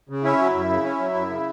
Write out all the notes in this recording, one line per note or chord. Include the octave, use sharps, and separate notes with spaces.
C#3
C#4 E4
F#3
F#2
C#3
C#4
F#3
F#2
C#3